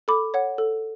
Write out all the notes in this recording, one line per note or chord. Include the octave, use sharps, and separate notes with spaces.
A4 B5 D6
C#5 F#5
A4